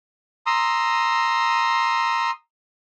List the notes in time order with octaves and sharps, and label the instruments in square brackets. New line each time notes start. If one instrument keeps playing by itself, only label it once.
[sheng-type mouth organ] A#5 C6 D#6 E6